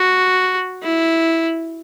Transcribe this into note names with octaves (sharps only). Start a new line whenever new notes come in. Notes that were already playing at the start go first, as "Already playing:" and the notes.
Already playing: F#4
E4